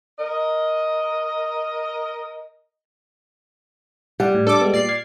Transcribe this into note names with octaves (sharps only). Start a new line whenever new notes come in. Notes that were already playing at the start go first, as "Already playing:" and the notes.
A#4 D#5
G3 F#5
A2
D4 A4 D6
G#3 B3
A#2 D5 C7
F6 G#6 A6